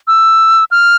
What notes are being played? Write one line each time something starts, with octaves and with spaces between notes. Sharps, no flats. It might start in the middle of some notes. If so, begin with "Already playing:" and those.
E6
F6